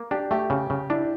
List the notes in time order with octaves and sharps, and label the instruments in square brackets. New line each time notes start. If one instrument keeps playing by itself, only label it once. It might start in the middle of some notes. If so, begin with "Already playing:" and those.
Already playing: [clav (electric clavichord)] A#3
[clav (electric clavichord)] D4 [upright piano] G4
[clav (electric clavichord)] A3 [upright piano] G4
[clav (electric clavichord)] C#3
C#3
[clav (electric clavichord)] D4 [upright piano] E4